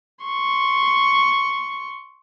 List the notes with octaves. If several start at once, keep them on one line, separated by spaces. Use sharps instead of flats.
C6 C#6